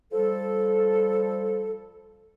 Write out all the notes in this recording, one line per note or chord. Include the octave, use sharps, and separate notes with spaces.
F3 G3 A4